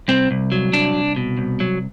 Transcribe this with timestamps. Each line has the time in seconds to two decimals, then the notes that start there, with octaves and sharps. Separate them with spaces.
0.08 C2 C4
0.31 C2
0.52 F#3
0.73 C2 D4
0.95 C2
1.16 B2
1.38 C2
1.60 F#3